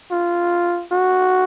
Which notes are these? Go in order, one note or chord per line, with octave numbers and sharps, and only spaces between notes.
F4
F#4